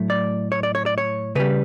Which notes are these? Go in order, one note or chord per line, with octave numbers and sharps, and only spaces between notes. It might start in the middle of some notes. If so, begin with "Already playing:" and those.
Already playing: A2 F#3 A3
D5
C#5
D5
C#5
D5
C#5
C#3 G3 B4